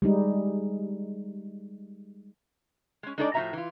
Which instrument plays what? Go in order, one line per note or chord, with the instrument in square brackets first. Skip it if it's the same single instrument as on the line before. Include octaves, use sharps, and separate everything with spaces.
[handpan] G3 G#3 D#4
[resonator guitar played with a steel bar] G#3 C#4
G#3 D4 D#4 A4 B4 D5
A2 F3 C#4 F#4 E5 A#5
E3 F4